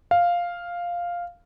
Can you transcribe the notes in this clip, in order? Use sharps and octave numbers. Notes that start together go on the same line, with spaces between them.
F5